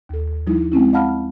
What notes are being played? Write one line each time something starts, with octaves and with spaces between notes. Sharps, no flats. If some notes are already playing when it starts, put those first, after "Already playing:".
D#2 A4
F3 G3 D#4 E4
G#3 C4 C#4 E4
D#5 F5 F#5 A5 B5 F6